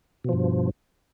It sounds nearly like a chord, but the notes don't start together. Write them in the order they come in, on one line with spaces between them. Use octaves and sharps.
B2 F3 G2